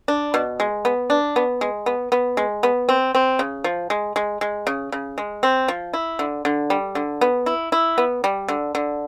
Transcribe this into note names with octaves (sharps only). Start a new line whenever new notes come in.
D4
B2
G#3
B3
D4
B3
G#3
B3
B3
G#3
B3
C4
C4
C#3
F3
G#3
G#3
G#3
C#3
C#3
G#3
C4
F3
E4
D3
D3
G3
D3
B3
E4
E4
B3
G3
D3
D3